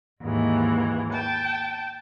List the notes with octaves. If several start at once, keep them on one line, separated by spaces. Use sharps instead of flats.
D#2 G#2 E3
G5 A5